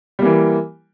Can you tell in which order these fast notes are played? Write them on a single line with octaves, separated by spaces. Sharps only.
G3 A#3 E3